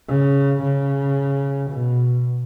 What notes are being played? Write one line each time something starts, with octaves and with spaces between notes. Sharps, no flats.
C#3
C#3
B2